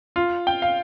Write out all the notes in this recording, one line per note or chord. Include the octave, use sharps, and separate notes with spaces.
F4
G5
F5